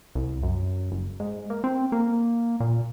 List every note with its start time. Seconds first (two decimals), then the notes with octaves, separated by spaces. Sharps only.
0.15 C2
0.43 F#2
0.92 F#1
1.20 G#2
1.50 A#3
1.64 C4
1.92 A#3
2.60 A#2